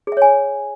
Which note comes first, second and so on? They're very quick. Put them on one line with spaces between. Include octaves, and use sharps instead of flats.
G#4 E5 C#5 G#5